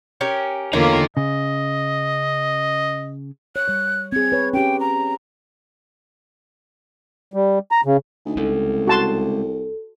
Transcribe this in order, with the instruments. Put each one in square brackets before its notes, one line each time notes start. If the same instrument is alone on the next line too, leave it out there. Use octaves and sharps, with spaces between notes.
[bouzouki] C#4 G4 A#4
[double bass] E2 D3 [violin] A#3 F4 [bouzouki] C#4 [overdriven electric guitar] D#4 A#4
[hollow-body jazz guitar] C#3 [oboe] D#5
[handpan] C#5 [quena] F#6
[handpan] G3 C#5
[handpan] C4 G#4 [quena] G#6
[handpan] B4 C#5
[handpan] C#4 G4 [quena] G5
[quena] A#5
[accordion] G3
A#5
C#3
[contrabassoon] D2 [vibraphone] D#4 D#5 G#5
[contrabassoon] C2 [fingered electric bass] G#3 C#4 [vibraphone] A4
[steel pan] F#4 A5 C6